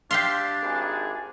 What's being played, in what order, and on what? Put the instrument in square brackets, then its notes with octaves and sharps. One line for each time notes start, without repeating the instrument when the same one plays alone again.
[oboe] D4 [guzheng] G4 E5 F5 [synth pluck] C6
[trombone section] G#1 D#4 G#4